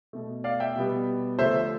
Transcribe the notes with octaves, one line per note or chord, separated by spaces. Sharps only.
B2 A3
D5 F5
E5 G5
B2 G3 B3
D3 F3 A3 C5 E5